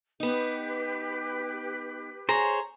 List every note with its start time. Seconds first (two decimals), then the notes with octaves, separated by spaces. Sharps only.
0.20 B3 D#4 G4 B4
2.29 G#4 C5 C#5 A#5